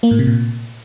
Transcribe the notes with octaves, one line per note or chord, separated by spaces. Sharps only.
A#3
A2
C3
A#2